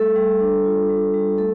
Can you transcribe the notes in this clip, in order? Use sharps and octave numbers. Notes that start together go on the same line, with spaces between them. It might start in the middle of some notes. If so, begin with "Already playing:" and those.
Already playing: G3 A3 A4
G3
D4
F4
G3
G3
A3 A4